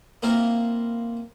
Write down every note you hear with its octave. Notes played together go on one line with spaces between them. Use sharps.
A#3 C4 E4 F4 A#4